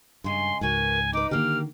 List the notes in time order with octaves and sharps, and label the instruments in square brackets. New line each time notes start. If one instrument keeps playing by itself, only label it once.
[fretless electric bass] G2 [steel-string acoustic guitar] C#3 G#3 G#5 [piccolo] C6
[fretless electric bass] C#2 G#2 [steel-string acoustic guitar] F#4 A#4 B4 [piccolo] G#5
[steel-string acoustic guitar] D#4 B4 [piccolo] D6
[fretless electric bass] D3 D#3 [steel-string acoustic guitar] A#3 G4 [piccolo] F6